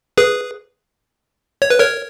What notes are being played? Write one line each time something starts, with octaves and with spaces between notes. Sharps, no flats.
G#4 B4
C#5
B4
A#4 C#5